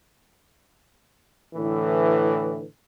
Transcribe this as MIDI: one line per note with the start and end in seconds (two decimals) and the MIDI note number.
1.55 2.64 45
1.55 2.64 50
1.55 2.64 52